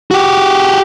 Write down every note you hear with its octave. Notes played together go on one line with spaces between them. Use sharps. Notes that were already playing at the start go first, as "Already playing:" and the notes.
F#4 G4